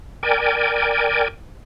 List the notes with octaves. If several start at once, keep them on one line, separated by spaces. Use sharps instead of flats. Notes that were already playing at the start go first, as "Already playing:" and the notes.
A#4 D5 G5 G#5